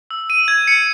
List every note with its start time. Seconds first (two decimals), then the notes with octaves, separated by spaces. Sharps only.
0.11 E6
0.30 D#7
0.48 G#6
0.67 C#7